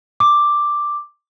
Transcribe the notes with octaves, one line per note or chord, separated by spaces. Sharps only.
D6